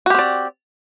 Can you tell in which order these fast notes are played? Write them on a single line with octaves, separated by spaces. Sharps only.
F#4 G4 C4 D5